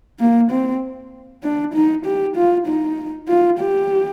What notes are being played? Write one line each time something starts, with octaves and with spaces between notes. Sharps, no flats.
A#3
C4
D4
D#4
G4
F4
D#4
F4
G4